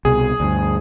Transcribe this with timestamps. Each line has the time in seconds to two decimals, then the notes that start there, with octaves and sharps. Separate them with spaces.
0.05 C2 B2 G#4
0.40 D2 G2